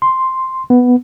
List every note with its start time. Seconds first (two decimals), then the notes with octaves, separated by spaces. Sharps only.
0.02 C6
0.70 B3